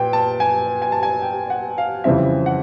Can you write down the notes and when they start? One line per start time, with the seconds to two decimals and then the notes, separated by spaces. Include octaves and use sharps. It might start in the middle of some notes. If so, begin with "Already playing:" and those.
Already playing: A#2 B3 G5
0.13 A5
0.40 G#5
0.82 G#5
0.92 A5
1.03 G#5
1.22 G5
1.50 F#5
1.78 F5
2.04 F2 C#3 E3 G3 C4 E5
2.46 F#5